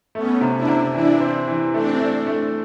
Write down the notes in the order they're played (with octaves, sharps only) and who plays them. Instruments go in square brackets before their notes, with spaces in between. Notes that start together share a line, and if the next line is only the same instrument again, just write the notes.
[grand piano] A3 [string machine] B3 C#4
[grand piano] C3
[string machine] D4 E4
[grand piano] C3
[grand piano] E3 [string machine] D4 E4
[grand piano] C4
E3
[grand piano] A3 [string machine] C4 D4
[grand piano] A3
A3